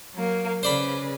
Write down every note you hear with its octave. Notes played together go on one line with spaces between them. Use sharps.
F#3 A#3
C#3 B4 C5 D5 B5